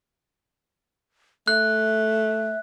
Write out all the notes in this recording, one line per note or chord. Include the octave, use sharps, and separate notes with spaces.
A3 E5 F#6